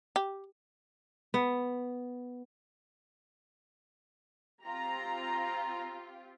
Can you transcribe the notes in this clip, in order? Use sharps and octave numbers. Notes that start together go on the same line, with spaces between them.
G4
B3
C4 F4 G4 A#5